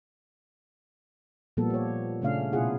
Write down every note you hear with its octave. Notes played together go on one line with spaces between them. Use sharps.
A#2 F3 G3 A#3 B3 A4
G4 C#5
A#2 C#3 A3 C#4 D4 F5
B2 E4 F4 G#4 F#5